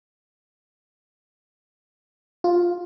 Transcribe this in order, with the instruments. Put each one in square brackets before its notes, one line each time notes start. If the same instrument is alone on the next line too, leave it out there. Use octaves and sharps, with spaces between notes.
[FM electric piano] F4